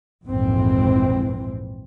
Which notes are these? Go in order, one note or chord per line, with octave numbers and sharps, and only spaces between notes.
A#1 F2 G#2 E3 C4